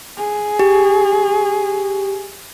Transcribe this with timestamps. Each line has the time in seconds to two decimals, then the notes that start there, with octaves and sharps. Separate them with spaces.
0.18 G#4
0.59 G4